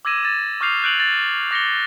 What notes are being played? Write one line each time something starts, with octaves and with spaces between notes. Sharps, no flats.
D6 E6 G#6 A#6 D#7 E7
A6
C#6 D6 F6 G6 C7 F7
F#6 G6 D7 F7 F#7
A6
D6 A#6 C#7 G7